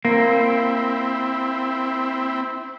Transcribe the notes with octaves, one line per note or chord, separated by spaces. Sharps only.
A#3 C4 E4